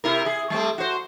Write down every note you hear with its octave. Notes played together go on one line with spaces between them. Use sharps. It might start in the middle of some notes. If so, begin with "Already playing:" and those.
C3 E4 A#4
G#4
G3 A3 C4
F#4 C5